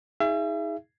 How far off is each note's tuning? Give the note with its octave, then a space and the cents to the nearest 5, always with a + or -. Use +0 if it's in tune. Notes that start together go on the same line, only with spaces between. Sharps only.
D#4 +35 G#4 -10 E5 +40